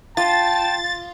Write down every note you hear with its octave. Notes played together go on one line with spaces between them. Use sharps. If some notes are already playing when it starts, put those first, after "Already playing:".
F4 G5 A5 A6